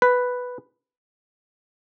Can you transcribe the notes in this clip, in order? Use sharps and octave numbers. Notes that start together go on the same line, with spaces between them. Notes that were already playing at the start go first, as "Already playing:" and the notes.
B4